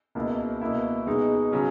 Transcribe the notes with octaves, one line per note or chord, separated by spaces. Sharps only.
C#2 B2 A#3 E4
B2 A#3 E4
B2 G#3 D#4
C#3 F#3 C#4